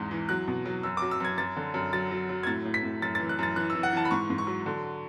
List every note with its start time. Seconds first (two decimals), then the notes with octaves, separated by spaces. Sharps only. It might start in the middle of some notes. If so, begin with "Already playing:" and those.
Already playing: E2 G#2 E3
0.11 E3
0.29 F#3 F#6
0.48 B2
0.66 F#3
0.83 F#2 E6
0.97 F#3 D6
1.11 E6
1.20 F#2 G#6
1.37 F#2 A6
1.56 D3
1.74 F#2
1.93 F#3 A6
2.11 F#3
2.29 F#3
2.43 G#6
2.47 A2 A6
2.65 A2
2.74 B6
2.83 A2
3.02 F#2 A6
3.15 E3 A6
3.29 F#6
3.39 F#2 A6
3.56 E3 F#6
3.70 E6
3.75 E3
3.83 F#5
3.93 E3 A5
4.05 B5
4.11 G#2 C#6
4.30 G#2
4.38 C#6
4.47 F#3
4.66 D3